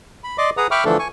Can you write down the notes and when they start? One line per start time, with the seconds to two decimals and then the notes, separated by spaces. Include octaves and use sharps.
0.24 B5
0.38 D5 D#5 C6 D6
0.57 G#4 B4 F#5 A#5 D#6
0.71 E5 G5 B5 C#6 D6 F6
0.85 D3 E3 F3 A3 D4 A4
0.99 G#5 C#6